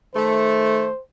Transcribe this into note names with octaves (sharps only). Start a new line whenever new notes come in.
D#3 A3 C5